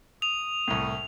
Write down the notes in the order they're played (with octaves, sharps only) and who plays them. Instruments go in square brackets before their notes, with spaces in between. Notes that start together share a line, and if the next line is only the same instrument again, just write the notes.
[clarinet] D#6 [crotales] F7
[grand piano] C2 A2